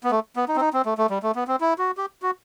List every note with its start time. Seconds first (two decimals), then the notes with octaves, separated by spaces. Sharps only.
0.04 B3
0.11 A3
0.36 B3
0.48 D#4
0.56 C4
0.61 D#4
0.73 C4
0.85 A3
0.98 A3
1.10 G3
1.23 A3
1.35 B3
1.47 C4
1.61 E4
1.78 F#4
1.97 G4
2.22 F#4